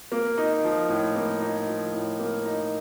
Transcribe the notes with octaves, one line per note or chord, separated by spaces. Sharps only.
A#3
D#4
F3
A2
A#3
D#4
F3
A2
A#3
D#4